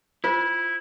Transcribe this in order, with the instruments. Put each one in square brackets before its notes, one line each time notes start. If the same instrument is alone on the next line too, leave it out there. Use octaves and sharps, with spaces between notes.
[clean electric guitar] E4 [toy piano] F4 C5